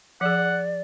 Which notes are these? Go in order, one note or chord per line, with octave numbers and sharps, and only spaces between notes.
F3 G#4 D5 F#5